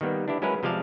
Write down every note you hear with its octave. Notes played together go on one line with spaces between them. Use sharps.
D#3 G3 A#3 B3
D4 E4 G4
F#3 G#3 C#4 E4 A#4 B4
C3 F3 G#3 D5 F5 A5